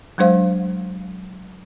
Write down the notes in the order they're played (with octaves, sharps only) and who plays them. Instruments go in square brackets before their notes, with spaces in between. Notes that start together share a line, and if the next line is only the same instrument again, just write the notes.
[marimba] F#3 G#3 D4 C5 F5